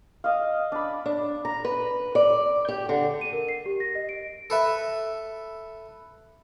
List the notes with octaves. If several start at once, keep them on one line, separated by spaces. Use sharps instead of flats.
D#5 F5
D4 B5
D4
A#5
B4
D5
G4
D3
D#7
A#4
C7
G4
A#6
D#5
D7
A4 B4 E5